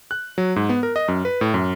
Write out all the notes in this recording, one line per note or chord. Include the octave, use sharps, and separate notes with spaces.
F#6
F#3
G#2
B3
A#4
D#5
F#2
B4
A2
F#2